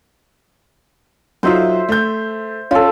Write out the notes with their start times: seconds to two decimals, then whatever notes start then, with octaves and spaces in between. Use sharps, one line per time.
1.43 F#3 D#4 F4 C5 E5
1.89 A3 G6
2.71 C#4 F4 A4